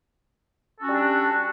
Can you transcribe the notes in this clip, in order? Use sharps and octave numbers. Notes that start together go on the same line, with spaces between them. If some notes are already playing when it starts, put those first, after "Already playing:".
G3 C#4 D4 F#4 A4